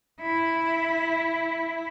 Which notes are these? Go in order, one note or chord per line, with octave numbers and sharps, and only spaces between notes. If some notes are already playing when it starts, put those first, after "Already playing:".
E4